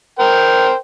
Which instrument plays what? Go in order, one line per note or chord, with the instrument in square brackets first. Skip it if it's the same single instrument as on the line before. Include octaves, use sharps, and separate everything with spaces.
[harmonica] A#4 C5 G5